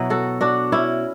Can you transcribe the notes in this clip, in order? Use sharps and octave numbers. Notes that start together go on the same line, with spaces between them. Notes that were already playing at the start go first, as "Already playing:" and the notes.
Already playing: B2 F#3 B3 E4
F#4 A4
D4 F#4
C#4 E4